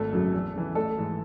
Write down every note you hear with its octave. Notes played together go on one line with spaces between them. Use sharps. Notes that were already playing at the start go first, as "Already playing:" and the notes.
Already playing: G#1 A3 A4
F#2 C#3 F#3
E2
C#3 E3
A1 A3 A4
G#2 E3